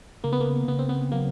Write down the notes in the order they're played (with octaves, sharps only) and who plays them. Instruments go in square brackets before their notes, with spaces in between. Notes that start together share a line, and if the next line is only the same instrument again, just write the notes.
[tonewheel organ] C#3 [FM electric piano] A#3
[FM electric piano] B3
A#3
[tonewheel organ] C#3 [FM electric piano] B3
[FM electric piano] C4
B3
[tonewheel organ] F#3 [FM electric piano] A#3